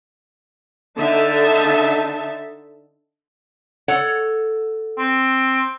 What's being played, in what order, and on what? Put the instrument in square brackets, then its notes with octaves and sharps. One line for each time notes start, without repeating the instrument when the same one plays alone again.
[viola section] D3 D#4 E5 A5
[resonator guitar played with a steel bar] A4 C#5 F#5
[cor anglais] C4